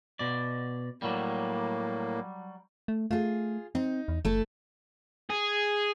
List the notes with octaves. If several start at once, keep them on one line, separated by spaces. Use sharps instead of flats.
B2 D5
A2 F#3 G3 A#3
A3
A3 F4 G#4
C4 D#4
E2
F#1 A3 E4 A4
G#4